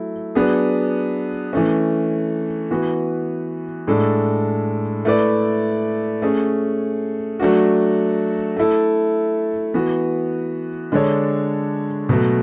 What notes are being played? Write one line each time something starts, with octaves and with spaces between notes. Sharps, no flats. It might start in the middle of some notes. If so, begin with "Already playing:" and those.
Already playing: F#3 A3 E4
F#3 B3 D4 G#4
E3 A3 C#4
E3 B3 F#4
A2 G#3 D4 A4
A3 E4 B4 D5
A3 C#4 G#4
F#3 A3 D4 F#4
A3 E4 A4
E3 B3 F#4
D3 G#3 D4 A4 C#5
B2 F#3 A3